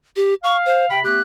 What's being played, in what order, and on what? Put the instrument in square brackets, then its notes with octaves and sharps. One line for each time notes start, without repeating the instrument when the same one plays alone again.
[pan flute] G4
[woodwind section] F5 [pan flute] C#6
[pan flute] C5
[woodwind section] C3 B5 [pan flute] G5
[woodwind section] A3 B3 G4 [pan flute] F#6